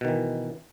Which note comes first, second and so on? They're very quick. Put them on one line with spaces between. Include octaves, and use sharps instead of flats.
B2 D#3 E3